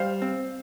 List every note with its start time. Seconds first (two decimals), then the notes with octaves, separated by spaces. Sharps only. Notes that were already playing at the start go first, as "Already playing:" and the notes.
Already playing: G3 C5 F5
0.22 C4